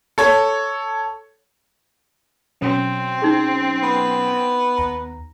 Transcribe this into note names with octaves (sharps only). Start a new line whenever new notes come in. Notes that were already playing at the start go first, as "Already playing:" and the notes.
A4 C#5
B2 F#3 C4 C#4
D#4 G#4
B3
D#2 A#5